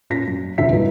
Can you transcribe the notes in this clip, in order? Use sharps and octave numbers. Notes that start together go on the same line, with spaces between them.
A#2 C#4 F4 A#6 B6
F#2
E1 C#2 D3 F4 E5 B6
G2 A#2 E3 B3 D#4